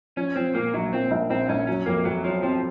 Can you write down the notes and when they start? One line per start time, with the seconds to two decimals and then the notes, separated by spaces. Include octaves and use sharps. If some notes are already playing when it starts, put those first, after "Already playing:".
0.17 F3 C#4
0.36 F3 C4
0.55 A#2 A#3
0.74 A#1 F#3
0.93 A#2 C4
1.11 A#1
1.30 A#1 C4
1.49 A#1 C#4
1.67 F#3 C#4
1.86 F2 A#3
2.05 F2 F#3
2.24 F3 F#3
2.43 F3 C4